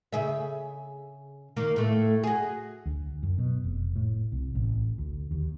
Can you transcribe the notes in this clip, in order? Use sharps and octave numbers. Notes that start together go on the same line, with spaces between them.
C#3 G#4 E5
D#3 A#3
A2 A3
F#4 G#4
D2
F#2
B2
F1
A2
C2
A1
D2
D#2